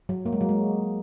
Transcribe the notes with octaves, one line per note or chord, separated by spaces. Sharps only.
F#3
A#3
G#3
F#3
G#3